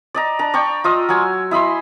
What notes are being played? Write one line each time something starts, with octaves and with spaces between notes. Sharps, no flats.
D5 D#5 A#5
D4 A#5
D5 G5 C#6
F4 D#5 D#6 E6
F#3 G#5 E6
E4 D#5 B5 C6